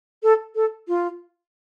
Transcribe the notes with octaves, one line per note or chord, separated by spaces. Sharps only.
A4
A4
F4